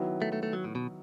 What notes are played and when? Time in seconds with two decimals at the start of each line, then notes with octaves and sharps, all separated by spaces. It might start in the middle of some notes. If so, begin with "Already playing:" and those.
Already playing: D#3 F#3 B3 E4
0.22 A3
0.33 A3
0.43 A3
0.53 F#3
0.64 A2
0.75 B2